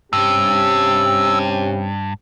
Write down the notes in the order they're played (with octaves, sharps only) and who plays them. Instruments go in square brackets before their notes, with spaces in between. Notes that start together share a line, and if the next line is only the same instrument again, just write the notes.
[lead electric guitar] G2 [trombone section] C3 C#4 G4 [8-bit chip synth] E6